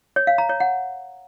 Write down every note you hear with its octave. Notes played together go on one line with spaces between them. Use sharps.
C#5
F5
A#5
C#5
F#5